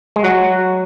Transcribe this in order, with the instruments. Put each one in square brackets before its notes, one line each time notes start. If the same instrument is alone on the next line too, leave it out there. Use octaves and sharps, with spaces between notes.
[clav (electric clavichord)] G#3
[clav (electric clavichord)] F#3 [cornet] F#4